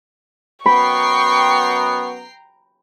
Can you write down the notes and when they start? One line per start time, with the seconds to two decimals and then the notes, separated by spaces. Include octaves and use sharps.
0.66 F#2 B3 G5 A#5 B5 C#6 C7